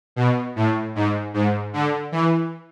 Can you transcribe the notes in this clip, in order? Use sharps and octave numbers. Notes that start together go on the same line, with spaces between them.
B2
A2
G#2
G#2
D3
E3